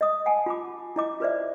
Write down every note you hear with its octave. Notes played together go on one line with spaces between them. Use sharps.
D#5 D#6
F#5 G#5 A5
F4 B5 D6
E4 D#5 D6
F4 B4 C5 D5 E5